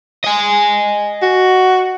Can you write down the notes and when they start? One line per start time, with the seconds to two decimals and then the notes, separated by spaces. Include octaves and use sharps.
0.24 D#5 G#5
1.22 F#4